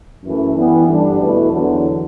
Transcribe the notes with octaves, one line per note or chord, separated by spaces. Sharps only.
F#2 E3 A3
E3 G3 B3
G2 D3 G3 D4
E2 B2 A3 E4 B4
E2 D3 F#3